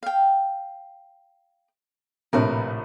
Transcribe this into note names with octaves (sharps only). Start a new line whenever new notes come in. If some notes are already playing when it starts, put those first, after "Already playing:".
F5 G5
A#1 A2 C3 A#4 B4